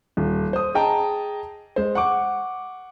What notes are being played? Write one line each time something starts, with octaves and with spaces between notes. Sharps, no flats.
D#1
C5 D#6
G#4 D#5 G5 A5 A#5
G#3 C5
F#5 C#6 D6